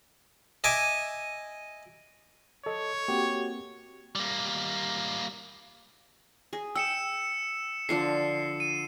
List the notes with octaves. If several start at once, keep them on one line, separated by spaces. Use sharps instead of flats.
D#5 E5 G#5 D6
A4 C#5 D#5
A#3 C4 F#4 G4
G3 A#3
G#4
G5 E6 C#7 E7
D3 F3 D4 C7
D#7